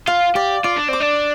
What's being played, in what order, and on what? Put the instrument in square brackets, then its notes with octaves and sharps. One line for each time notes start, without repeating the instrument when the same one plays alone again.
[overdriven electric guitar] F4 [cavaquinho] F5
[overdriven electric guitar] G4 [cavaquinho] D5
[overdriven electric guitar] F4 [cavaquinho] D5
[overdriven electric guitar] D4
[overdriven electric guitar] C4 [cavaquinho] D6
[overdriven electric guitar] D4